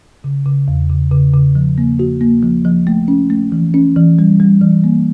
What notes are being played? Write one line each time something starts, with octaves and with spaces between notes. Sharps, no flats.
C#3
C#3
E2
C#3
C#3
C#3
F3
A#3
F#4
A#3
F3
F3
A3
C#4
A3
E3
C#4
E3
G3
G3
E3
A#3